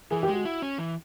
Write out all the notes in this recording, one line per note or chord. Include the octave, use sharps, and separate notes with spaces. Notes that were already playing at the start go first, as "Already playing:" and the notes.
E3 G#4
G4
G#3
F#4
E4
C#4
E3